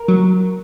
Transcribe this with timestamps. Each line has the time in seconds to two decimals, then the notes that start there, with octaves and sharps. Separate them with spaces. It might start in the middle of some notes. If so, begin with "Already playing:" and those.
Already playing: A#4
0.08 F#3